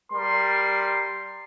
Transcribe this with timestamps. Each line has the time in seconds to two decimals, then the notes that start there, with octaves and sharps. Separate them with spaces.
0.12 G3 A#4 C6